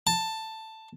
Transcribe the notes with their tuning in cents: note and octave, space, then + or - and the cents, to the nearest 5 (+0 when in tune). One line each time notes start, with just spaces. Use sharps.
A5 +10